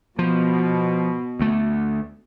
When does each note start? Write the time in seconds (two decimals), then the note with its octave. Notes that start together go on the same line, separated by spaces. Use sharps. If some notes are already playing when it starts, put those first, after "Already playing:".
0.19 B2 F3
1.39 D2 A3